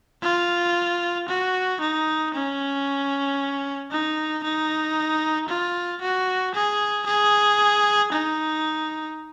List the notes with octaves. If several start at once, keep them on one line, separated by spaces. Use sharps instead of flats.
F4
F#4
D#4
C#4
D#4
D#4
F4
F#4
G#4
G#4
D#4